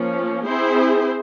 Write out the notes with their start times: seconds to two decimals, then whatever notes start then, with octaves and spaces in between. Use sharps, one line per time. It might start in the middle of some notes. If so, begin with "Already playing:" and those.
Already playing: F3 A#3 C#4
0.46 C4 E4 G#4 C5